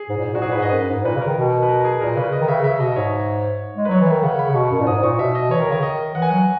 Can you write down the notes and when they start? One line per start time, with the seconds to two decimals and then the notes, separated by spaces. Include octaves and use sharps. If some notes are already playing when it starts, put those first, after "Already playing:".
Already playing: G#4
0.09 G#2
0.17 A#2
0.25 G#2
0.33 A#2 F#4
0.41 G#2 G#4
0.49 A#2 B4
0.57 G#2
0.62 D#5
0.73 F#2 B4
0.89 G#2
1.05 A#2 B4
1.16 C#3
1.21 A#4
1.27 D#3
1.37 B2
1.63 B4
1.68 A#4
1.80 A#4
1.85 G#4
2.00 A#2 A#4
2.16 C#3 B4
2.32 D#5
2.41 D#3
2.48 C#3 E5
2.64 C#3 E5
2.80 B2 D#5
2.92 D#5
2.96 G#2 C#5
3.76 G#3
3.85 B4
3.89 F#3 C#5
4.01 E3
4.07 D#3 E5
4.23 C#3 F#5
4.39 B5
4.50 C#3
4.55 B2 C#6
4.71 F#2
4.81 A#2
4.87 G#2 D#6
5.03 A#2 C#6
5.19 B2 E5
5.35 D#5
5.50 E3 C#5
5.61 D#3 A#4
5.70 C#3 C#5
5.80 D#3 D#5
6.15 E3 F#5
6.22 G#5
6.29 F#3 F#5